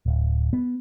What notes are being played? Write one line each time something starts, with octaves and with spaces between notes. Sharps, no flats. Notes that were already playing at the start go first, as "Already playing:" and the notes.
D1
B3